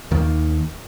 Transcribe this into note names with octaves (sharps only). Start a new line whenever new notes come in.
D#2 D#3 A#3